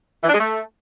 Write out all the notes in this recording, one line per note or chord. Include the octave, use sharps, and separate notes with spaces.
E3
D4
G#3
A3